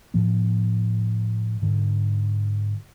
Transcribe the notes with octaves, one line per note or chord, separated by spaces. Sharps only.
A2 F3 B3
G#2 D3